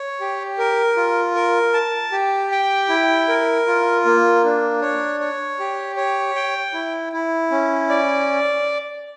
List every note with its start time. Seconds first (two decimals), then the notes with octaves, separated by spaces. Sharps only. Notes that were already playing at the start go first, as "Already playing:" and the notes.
Already playing: C#5
0.20 G4
0.58 A#4
0.97 F4
1.35 A#4
1.74 A5
2.12 G4
2.52 G5
2.89 E4
3.29 A#4
3.67 F4
4.05 A#3
4.44 D4
4.81 C#5
5.20 C#5
5.59 G4
5.97 C#5
6.35 G5
6.74 E4
7.13 E4
7.51 C#4
7.89 D5